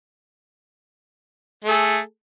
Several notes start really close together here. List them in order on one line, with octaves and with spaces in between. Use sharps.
A3 A4 G#4